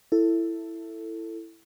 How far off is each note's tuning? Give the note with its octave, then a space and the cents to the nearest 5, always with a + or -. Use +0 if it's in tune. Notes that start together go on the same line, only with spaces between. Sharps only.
E4 +10 A4 +15